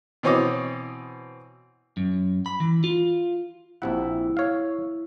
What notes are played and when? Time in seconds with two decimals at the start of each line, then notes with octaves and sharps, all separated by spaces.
0.23 B2 E3 C4 C#5 D#5 D6
1.97 F#2
2.46 B5
2.60 E3
2.84 F4
3.82 A#1 C3 E4 F#5
4.37 C#5 F5